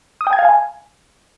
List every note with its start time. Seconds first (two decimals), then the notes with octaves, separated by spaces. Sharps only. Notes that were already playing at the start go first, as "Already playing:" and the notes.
0.21 D#6
0.27 G5
0.33 G#6
0.39 F5
0.45 G#5